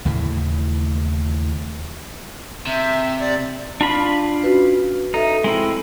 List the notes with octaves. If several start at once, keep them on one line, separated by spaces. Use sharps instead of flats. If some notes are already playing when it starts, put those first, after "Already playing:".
D#2 A2 C#3 E3
C3 E5
D5
D4 F4 B5
C#4 F#4 B4
D#4 A4 E5
G#3 C4 E4